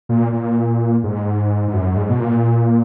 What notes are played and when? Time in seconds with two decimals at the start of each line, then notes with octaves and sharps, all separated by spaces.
0.09 A#2
0.33 A#2
1.04 G#2
1.68 G#2
1.74 F#2
1.96 G#2
2.09 B2
2.20 A#2